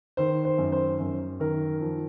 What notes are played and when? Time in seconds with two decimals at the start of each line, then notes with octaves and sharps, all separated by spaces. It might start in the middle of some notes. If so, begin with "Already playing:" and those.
0.17 D#3 C5
0.45 C5
0.58 F#2
0.72 C5
1.00 F#2
1.40 D#3 A#4
1.81 F3